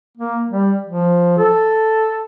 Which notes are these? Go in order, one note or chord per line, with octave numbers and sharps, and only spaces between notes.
A#3
G3
F3
A4